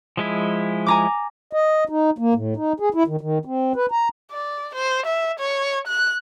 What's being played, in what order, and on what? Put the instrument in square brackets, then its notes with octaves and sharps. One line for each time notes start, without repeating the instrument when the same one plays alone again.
[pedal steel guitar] F3 G#3 E4
[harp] G#5 A#5 D6
[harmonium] D#5
D#4
A#3
A2
D#4
G#4
E4
D#3
D#3
C4
B4
A#5
[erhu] D5
C5
E5
C#5
F#6